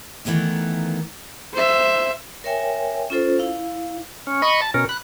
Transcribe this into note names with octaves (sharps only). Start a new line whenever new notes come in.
D#3 E3 A3 B3 A#4
C5 E5
A#4 C#5 E5 G5 G#5
C#4 F4 A4 C5
E4 F5
C#4
D#5 B5 C#6
A5
B2 C#4 A#4
B5 F#6